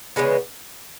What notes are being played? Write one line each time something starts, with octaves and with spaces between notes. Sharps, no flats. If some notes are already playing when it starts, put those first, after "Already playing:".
C#3 E3 G#3 B3